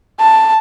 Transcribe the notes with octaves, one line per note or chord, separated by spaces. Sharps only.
A5